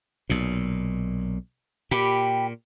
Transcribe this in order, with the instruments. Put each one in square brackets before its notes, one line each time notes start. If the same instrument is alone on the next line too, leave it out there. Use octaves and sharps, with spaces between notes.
[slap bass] B1 A#2
[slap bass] A#2 [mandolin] G4 B5